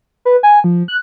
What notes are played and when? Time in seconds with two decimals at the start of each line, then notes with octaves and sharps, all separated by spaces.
0.25 B4
0.43 G#5
0.64 F3
0.88 F#6